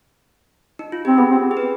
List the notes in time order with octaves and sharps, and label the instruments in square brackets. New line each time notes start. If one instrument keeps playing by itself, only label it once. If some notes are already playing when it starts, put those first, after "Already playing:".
[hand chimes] D#4
F4
[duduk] C4 [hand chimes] G4
[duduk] B3 [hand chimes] G#4
[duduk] C4
[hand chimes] G#4
B4